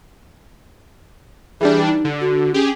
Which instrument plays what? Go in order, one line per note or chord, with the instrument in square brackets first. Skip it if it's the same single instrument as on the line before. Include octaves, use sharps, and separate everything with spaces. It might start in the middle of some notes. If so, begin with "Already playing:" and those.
[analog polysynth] E3 G3 D4 [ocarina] G#4
[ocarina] D#4
[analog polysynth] D3
[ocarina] F#4
[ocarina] C#4 [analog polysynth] G4 G#4